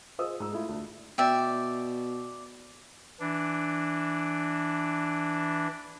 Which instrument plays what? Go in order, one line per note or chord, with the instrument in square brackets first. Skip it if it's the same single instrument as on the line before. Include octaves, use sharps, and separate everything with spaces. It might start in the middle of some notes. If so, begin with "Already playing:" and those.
[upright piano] F4 G#4 C5 D#5 D#6 E6
G#2 E6
A3 E4 F4
D2
[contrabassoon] B2 [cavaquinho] D5 E5 G5
[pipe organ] E3 D4